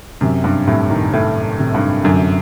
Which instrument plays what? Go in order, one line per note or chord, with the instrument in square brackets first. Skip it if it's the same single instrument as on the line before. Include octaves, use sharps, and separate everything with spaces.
[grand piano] F#2 [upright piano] C3
[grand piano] G2
[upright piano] C2 [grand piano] A2
[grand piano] D#3
[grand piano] A2 [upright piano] A3
[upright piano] C3
[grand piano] G2
[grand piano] F#2 [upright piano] D3